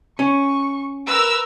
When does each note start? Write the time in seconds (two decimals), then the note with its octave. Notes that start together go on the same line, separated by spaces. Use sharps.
0.19 C#4 C#6
1.08 A#4 B4 E6